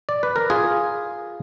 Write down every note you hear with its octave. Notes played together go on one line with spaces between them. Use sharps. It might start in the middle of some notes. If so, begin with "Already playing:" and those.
D5
B4
A#4
F4 G#4